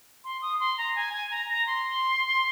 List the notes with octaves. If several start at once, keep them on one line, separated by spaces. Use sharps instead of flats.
C6
D#6
C6
A#5
G#5
G#5
A#5
A#5
C6